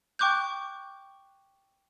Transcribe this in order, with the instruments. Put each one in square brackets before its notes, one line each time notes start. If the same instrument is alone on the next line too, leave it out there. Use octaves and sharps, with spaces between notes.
[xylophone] G5 C#6 D6 F#6 G6